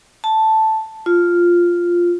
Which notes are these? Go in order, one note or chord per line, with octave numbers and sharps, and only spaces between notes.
A5
F4